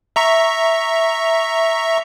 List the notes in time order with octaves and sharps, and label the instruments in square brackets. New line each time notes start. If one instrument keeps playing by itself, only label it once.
[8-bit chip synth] E5 A#5 C#6